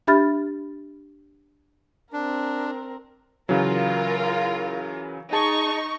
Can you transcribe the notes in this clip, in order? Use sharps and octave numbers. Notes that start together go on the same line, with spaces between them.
D4 G4 E5 B5 F6 A6
C4 D4 A#4
C#3 E3 F#3 F4 A#4
D#4 G#4 A5 C#6